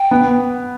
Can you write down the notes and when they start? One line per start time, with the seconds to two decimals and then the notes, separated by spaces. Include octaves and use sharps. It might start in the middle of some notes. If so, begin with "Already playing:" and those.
Already playing: G5
0.11 B3